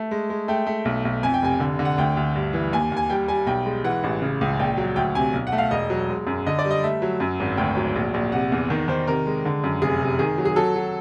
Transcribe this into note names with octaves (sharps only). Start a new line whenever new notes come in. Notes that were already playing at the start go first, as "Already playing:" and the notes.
Already playing: A3
G#3
G#3
A3 G5
A3
B1
B1
F2 G#5
G5
F1 G#5
D3
D3
F#5
D2 G5
D2
G2
E3
D#2 G#5
D#2 G#5
G3 G5
G3 G#5
B1 G5
G#3
E3 F#5
A1
C#3
C#2
A#1 G5
F#3
D2 G5
C3 G#5
B1
F#5
A3
F5
E1 D#5
F#3
G#3
F#2
D3 D#5
D5
G3
D#5
A3 E5
F#3
F#2
G#1
D2 G5
F#3
A#1
A#1
C3 F#5
E2
D#3
D#3 C5
C3 A#4
G#3
D3
F#2
F1 G#4
C3
D#3 G#4
F#3
G#4
F#3 A4
F#3